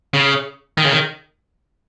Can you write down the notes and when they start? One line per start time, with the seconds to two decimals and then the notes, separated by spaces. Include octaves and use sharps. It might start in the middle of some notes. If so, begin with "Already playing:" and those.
0.14 C#3
0.78 D#3
0.85 C#3
0.93 D#3